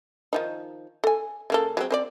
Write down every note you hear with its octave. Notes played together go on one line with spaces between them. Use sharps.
D#3 F3 D#4
A4 G#5
C#3 A#3 A4
F#3 G#3 C4
C4 C5 D5